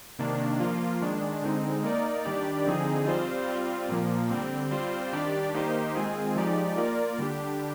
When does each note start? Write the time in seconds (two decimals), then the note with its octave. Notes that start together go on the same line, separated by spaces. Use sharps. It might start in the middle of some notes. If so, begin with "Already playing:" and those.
0.19 C3 D#3 A#3 D4
0.60 F3 A#3 F4
1.01 D#3 G#3 D4
1.42 D3 G#3 C4 D#4
1.83 A#3 D#4 A#4 D5
2.25 D#3 G3 D4 G4 D5
2.66 D3 F3 C4 D#4 G#4
3.07 G3 C4 F4 C5
3.48 G3 C4 F4
3.88 A#2 F3 A#3
4.30 D3 G3 C4
4.71 G3 C4 F4 C5
5.13 D#3 G3 D4 G4 D5
5.54 D#3 A#3 D#4 G4 C5
5.95 D#3 G#3 C4 F4 G#4
6.36 F3 G#3 D#4 G4 D5
6.76 A#3 F4 A#4 D5
7.18 D3 G3 D4 G4